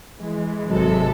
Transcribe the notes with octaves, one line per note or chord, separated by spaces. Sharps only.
E3 G#3
G#1 C3 F#3 A4